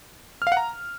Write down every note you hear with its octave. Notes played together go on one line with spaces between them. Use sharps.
F6
F5
F#5
A#5